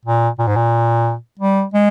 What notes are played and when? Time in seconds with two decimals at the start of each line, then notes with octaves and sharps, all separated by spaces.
0.05 A#2
0.39 A#2
0.47 G#2
0.56 A#2
1.40 G3
1.74 G#3